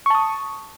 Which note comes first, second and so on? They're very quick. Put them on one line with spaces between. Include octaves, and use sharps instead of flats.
C#6 A5 D#6